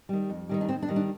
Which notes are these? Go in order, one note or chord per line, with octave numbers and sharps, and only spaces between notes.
D#3 G3
F2
D#3 G3 D#4
D4
D#2 C4
D4
D#3 G3
D4